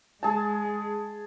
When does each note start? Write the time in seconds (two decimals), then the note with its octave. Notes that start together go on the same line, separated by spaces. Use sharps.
0.23 G#3 G#4 A5